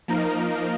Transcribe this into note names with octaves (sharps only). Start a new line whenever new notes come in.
F3 A#3 D#4 A#4